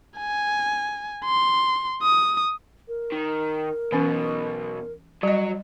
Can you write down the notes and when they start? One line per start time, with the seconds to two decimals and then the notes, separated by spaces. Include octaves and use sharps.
0.18 G#5
1.25 C6
2.02 D#6
2.88 A#4
3.12 D#3
3.92 B1 B2 E3 C#4
5.23 F#3 G3 F#4 D#5